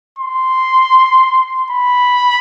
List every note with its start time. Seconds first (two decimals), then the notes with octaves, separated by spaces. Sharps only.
0.19 C6
1.71 B5